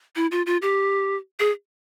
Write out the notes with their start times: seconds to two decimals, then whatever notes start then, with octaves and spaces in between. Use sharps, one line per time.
0.16 E4
0.31 F4
0.46 F4
0.62 G4
1.40 G#4